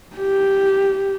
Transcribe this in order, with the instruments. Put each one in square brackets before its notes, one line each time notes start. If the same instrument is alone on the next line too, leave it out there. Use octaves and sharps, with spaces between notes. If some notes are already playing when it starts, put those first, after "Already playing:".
[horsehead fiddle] G4